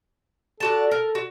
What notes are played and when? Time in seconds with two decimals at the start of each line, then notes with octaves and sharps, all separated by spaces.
0.60 D4 F#4 A4 A5
0.91 A#4
1.15 F#4